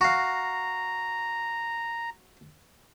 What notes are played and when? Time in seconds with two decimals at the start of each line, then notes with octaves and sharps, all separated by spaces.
0.01 F#4 F5 A#5